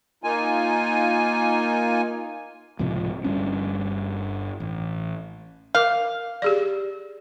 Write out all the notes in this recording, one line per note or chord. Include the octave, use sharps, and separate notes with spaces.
A#3 D#4 F4 G#5
C#2 A2 C3 F3
G1 G2 C#4
A1
A#4 F5 D6
G4 G#4 D5